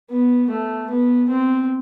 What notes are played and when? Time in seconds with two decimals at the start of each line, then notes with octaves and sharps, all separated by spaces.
0.11 B3
0.50 A3
0.90 B3
1.29 C4